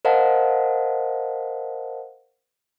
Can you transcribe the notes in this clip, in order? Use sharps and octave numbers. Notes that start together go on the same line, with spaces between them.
A#4 C5 D#5 F5 F#5 A5